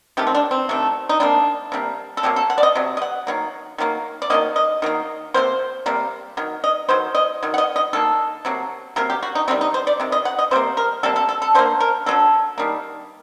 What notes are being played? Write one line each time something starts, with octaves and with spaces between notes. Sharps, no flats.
C3 D#3 A3 G4
C4
D4
C4
C3 D#3 A3
D#4
C3 G3 A#3 D4
C3 G3 A#3
A4
C3 F#3 A#3 G4
A4
F#5
D5
D#5
C3 F#3
D#5
F#5
D#3 F#3 A#3
D#3 F#3 A#3
D5
D#3 F#3 A#3 D#5
D#5
D#3 F#3 A#3
C3 G3 A#3 C5
C3 G3 A#3
D#3 F#3
D#5
D#3 F#3 C5
D#5
D#3 F#3
F#5
D#5
D#5
D#3 F#3 A#3 A4
C3 F#3 A#3
C3 F#3 A#3 A#4
G4
F#4
D#4
C3 D#3 G3 C4
D#4
C5
D5
C3 D#3
D#5
F#5
D#5
C3 G3 A#3 C5
A#4
C3 G3 A#3 A4
A4
A4
A4
D3 F#3 A#3 C5
A#4
D3 F#3 A#3 A4
D#3 G3 A#3